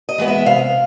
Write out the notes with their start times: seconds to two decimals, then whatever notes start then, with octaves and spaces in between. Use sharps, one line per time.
0.09 D#5
0.18 E3 G#3 B3
0.28 E5
0.46 C3 F5